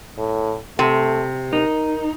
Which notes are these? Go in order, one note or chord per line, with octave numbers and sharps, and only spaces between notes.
A2
C3 A3
D#4 A#4